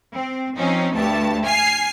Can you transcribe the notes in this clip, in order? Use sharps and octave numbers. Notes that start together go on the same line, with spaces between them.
C4
F3 C4 C#4 D#4
D2 G2 A3 A5
G#5 F6 C7